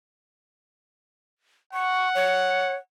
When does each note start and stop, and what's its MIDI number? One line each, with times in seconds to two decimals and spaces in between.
1.73 2.80 78
1.73 2.09 85
2.15 2.74 73